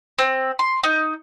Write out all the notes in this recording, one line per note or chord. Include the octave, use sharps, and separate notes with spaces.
C4
C6
D#4